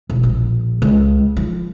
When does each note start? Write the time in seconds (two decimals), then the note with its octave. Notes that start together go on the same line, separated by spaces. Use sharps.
0.10 E1
0.23 A#1
0.82 C#2
1.37 F3